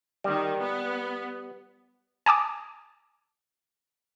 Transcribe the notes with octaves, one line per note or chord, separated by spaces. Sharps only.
D#3 G3
B3
G#5 A5 D6 D#6